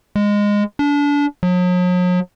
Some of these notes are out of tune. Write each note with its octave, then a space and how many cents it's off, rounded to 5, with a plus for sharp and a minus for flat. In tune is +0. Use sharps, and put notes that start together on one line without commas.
G#3 -15
D4 -30
F#3 -45